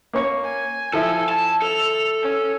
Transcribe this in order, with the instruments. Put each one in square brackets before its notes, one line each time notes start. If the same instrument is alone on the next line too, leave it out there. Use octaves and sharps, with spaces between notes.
[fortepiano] A#3 C#4 C#6
[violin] G#5
[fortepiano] F3 E4 [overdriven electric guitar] A4
[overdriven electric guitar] A5
[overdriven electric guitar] A4 [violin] F7
[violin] C#4